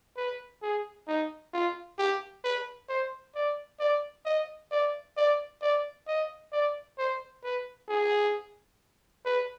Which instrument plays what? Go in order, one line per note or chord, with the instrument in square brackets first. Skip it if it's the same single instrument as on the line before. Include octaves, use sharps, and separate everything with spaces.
[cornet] B4
G#4
D#4
F4
G4
B4
C5
D5
D5
D#5
D5
D5
D5
D#5
D5
C5
B4
G#4
B4